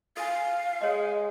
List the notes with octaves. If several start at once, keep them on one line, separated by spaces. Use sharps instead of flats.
A4 F5 G#5
G#3 A4 C#5 D#5